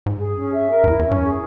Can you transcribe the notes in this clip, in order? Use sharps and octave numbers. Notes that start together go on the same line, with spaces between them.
G#2
G2 G#4
C#4
E5
A#4
G2
E2 E4
E2
C#4
G2
E2
G#4